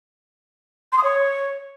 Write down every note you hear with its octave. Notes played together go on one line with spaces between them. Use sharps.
C6
D#6
C#5